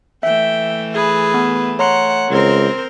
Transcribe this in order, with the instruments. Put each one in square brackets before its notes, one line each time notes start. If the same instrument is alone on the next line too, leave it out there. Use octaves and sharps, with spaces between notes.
[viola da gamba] E3 A3 [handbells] E5 [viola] G5
[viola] G#4 B4
[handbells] B3
[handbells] C#5 A#5 C6 [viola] F#5
[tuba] C#2 [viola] C4 [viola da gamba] A#4 C5